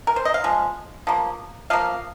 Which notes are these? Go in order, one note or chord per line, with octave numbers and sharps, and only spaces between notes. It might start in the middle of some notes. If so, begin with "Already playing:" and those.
A#4
C5
D#5
F5
F3 G#3
F3 A#3
F3 A#3 F5